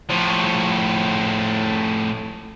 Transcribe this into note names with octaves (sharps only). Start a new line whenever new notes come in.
A2 F3